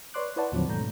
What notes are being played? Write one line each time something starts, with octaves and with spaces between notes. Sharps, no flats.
B4 C#5 D5 C6 D6 F#6
E4 B4 C#5 D5 F#5 A5
D#2 A2 D3 F3 F#3 C4
G#2 B2 A3 A#5 G6